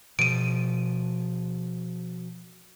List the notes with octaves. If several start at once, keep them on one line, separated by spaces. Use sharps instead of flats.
B2 F3 D7 D#7